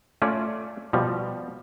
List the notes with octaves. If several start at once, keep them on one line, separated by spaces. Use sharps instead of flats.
A3 C#4 F4 D5
B2 F3 G3